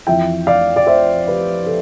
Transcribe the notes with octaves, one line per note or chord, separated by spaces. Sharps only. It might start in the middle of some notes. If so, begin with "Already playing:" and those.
F2 E3 E5 G5
D5 F5
D5
C5 E5
G4 B4
A4